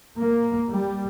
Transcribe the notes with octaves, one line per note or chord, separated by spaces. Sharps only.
A#3
G3